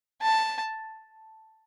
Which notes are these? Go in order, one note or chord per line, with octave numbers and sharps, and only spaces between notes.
A5